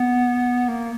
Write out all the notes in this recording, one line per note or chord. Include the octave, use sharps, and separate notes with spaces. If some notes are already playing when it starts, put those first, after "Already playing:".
Already playing: B3
A#3